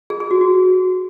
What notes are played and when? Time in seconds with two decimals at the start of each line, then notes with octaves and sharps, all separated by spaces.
0.10 G#4
0.20 G#4
0.31 F#4
0.41 F#4